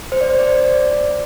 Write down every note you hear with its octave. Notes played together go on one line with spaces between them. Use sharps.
C5
D5
C5
D5
C5
D5